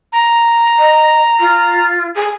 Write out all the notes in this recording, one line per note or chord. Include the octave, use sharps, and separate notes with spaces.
A#5
D#5
F4
G#4